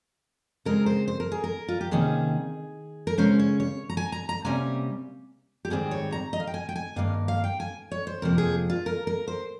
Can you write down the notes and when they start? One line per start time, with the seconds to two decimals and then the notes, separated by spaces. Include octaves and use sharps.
0.65 C#3 G#3 C4 A#4
0.86 C5
1.08 C5
1.20 A#4
1.32 G#4
1.44 A#4
1.68 F4
1.81 G4
1.91 C3 D#3 A#3 C#4 G#4
3.07 A#4
3.18 C#3 G#3 C#4 C5
3.39 C#5
3.60 C#5
3.89 A#5
3.97 G#5
4.12 A#5
4.29 A#5
4.45 C3 G3 A#3 C#4 G#5
5.65 G4
5.70 G#2 D#3 G3 C4 G#4
5.91 C#5
6.12 A#5
6.33 D#5
6.40 F5
6.47 G5
6.54 G#5
6.69 G5
6.76 G#5
6.96 G2 D#3 A#3 F5
7.28 F5
7.44 G5
7.60 G#5
7.91 C#5
8.07 C5
8.22 F2 C3 F3 A#3 A#4
8.38 G#4
8.70 F4
8.86 A#4
9.07 A#4
9.28 C5